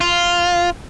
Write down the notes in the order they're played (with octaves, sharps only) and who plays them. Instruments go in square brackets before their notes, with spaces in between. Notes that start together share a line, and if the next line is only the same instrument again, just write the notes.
[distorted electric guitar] F4